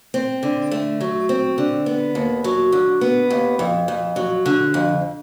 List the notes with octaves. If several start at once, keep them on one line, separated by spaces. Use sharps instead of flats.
C4
D3
A3
F#3
C4
D3
B3
D#2
F#3
D3
B3
D#2
F2
F2
F#3
D3
F2